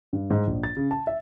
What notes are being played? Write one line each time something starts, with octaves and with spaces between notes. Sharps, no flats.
G2
G#2
A#1
A6
C#3
A5
E5